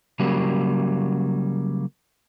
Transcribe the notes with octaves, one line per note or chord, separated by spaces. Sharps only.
C#3 F#3 G3 A#3